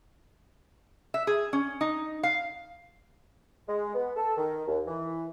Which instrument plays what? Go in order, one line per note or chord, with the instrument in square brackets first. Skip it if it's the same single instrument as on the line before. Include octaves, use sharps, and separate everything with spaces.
[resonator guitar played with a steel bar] E5
G#4
C#4
D#4
F5
[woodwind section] G#3
B3
A4
D#3
D#2
E3